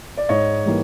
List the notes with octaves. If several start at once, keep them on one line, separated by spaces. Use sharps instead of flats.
D5
G#2 C#5 D#5
E3 G3 A#3 D#4